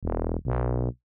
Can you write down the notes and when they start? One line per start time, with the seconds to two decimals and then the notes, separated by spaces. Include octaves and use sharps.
0.03 E1
0.45 B1